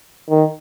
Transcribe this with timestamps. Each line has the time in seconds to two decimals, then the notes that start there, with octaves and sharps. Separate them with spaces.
0.29 D#3